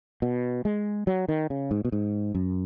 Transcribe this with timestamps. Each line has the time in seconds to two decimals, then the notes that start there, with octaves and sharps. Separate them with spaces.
0.22 B2
0.65 G#3
1.07 F#3
1.29 D#3
1.50 C#3
1.71 G#2
1.85 B2
1.92 G#2
2.35 F#2